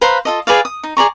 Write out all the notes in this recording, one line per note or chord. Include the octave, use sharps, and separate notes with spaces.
B4 C5 F5 A#5
F4 A4 D#5
G#4 B4 D5 F5
D#6
D#4
G#4 D5 A#5 C#6